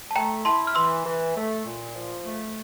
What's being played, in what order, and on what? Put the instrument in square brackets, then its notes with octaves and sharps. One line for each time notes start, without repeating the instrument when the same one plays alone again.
[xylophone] A5
[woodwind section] A3 [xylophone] G5 A#5
[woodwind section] E4 [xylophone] A5 C6
[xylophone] F6
[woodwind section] E3 [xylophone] C6 E6
[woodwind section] E3
A3
A#2
F3
A3